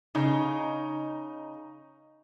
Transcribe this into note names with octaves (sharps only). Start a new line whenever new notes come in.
C#3 D#4